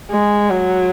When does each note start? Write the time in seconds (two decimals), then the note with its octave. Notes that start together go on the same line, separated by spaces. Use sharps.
0.11 G#3
0.50 F#3